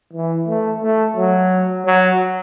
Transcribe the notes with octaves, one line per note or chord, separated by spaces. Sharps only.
E3
A3
A3
F#3
F#3